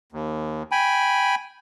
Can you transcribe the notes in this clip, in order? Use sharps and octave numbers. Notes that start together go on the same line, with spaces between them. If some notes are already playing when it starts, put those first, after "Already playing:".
D#2
G5 G#5 B5